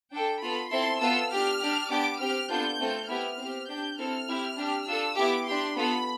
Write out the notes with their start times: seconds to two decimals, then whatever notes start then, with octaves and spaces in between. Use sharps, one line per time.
0.13 D4 A4 G5
0.41 B3 F4 A4 B5
0.72 C4 E4 A4 C6
1.01 B3 F4 A4 E6
1.31 D4 G4 F6
1.61 D4 G4
1.91 B3 D4 G4 D6
2.20 C4 G4 F6
2.50 B3 D4 F4 A4 G6
2.80 A3 C4 F4 A4
3.09 B3 E4 G4 F6
3.38 C4 G4
3.68 D4 G4 G6
3.98 C4 E4 A4 F6
4.29 C4 E4 G4
4.58 D4 G4
4.87 D4 F4 A4 E6
5.17 B3 E4 G4 D6
5.47 D4 G4 C6
5.76 B3 F4 A4 B5